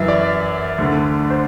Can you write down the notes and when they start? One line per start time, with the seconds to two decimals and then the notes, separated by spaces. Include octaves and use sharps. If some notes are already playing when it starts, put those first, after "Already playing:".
Already playing: F#2 E3 E5
0.08 D5
0.78 D2 D3
1.30 C5